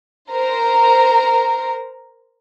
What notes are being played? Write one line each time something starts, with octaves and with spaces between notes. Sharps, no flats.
A#4 C5 A#5